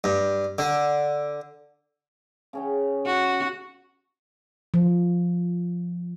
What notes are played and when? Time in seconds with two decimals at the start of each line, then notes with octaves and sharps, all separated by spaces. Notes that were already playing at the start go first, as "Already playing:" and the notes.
0.04 G2
0.58 D3
2.53 C#3 C#4 G5
3.06 F#4
4.74 F3